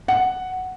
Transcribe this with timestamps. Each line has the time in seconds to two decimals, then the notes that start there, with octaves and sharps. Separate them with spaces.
0.08 F#5